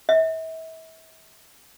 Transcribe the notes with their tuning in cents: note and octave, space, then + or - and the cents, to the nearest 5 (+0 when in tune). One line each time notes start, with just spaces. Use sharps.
E5 -35